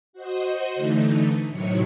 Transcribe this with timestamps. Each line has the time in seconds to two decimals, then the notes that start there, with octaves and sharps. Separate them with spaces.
0.13 F#4 C5 D#5
0.75 D3 E3 A3 D#4
1.50 A2 C3 D#3 F#3 C#5 C#7